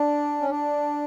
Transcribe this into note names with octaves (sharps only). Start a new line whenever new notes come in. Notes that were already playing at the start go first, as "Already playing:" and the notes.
Already playing: D4
C#4
D4